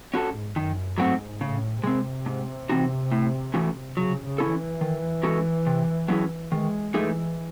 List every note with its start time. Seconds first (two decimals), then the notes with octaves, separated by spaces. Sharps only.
0.14 C#4 F#4 A4
0.28 G#2
0.56 F#2 D#3
0.98 G#2 F#3 A3 C4 F#4
1.41 A2 C#3
1.84 C3 G#3 C4
2.26 G#2
2.69 E3 C4 D#4 F#4
3.12 A2
3.54 E3 A3 C#4 F#4
3.97 C#3 F#3
4.25 C#3
4.38 C#4 E4 A4
4.53 E3
4.81 D#3
5.23 G#3 C#4 F#4 A4
5.67 C3
6.08 F#3 C#4 E4 G#4
6.52 D#3 G#3
6.94 E3 A3 D#4 G#4